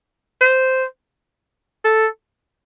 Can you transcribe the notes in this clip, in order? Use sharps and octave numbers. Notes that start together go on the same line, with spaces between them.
C5
A4